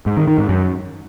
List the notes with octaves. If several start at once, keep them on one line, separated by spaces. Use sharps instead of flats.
G#2
D#3
D#3
G#2
F#2